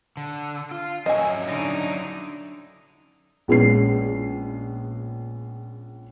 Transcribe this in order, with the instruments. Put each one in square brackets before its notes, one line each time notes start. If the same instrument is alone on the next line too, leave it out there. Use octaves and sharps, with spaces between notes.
[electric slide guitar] D3
F4
[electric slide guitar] F#3 C#4 E4 [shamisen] D#5 G#5
[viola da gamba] D3 D#4
[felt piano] A#1 G#3 B3 C#4 C7